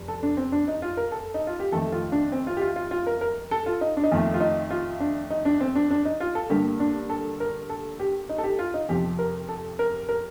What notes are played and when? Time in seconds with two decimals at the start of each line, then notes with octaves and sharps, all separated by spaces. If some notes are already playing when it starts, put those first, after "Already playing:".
Already playing: F1
0.08 A4
0.23 D4
0.37 C4
0.52 D4
0.68 D#4
0.82 F4
0.97 A#4
1.12 A4
1.34 D#4
1.47 F4
1.60 G4
1.72 F2 D#3 A3 A4
1.92 F4
2.12 D4
2.32 C4
2.47 F4
2.57 G4
2.61 F4
2.76 F4
2.91 F4
3.07 A#4
3.21 A#4
3.51 A4
3.66 F4
3.81 D#4
3.97 D4
4.03 D#4
4.11 F2 D#3 A3 F4
4.34 F4
4.40 D#4
4.71 F4
5.00 D4
5.30 D#4
5.45 D4
5.60 C4
5.75 D4
5.91 D4
6.05 D#4
6.20 F4
6.35 A4
6.50 G2 D3 G3 A#3 G4
6.80 D4
7.09 A4
7.40 A#4
7.70 A4
7.99 G4
8.29 D#4
8.38 A4
8.44 G4
8.59 F4
8.74 D#4
8.89 F2 C3 F3 G4
9.19 A#4
9.48 A4
9.79 A#4
10.09 A#4